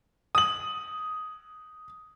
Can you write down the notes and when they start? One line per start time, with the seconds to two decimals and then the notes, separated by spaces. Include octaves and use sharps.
0.35 D#6 F#7